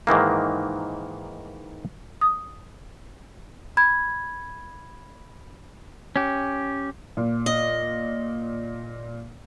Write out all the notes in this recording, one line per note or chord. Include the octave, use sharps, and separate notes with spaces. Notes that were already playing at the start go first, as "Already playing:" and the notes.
G#2 D#3 E3 A#3
D#6
B5 G#6
C#4 G4
A#2
D#5